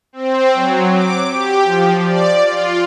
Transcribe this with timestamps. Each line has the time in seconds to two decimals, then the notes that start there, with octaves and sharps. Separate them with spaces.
0.13 C4
0.55 F#3
0.93 D6
1.29 G4
1.64 F3
2.06 D5
2.44 F4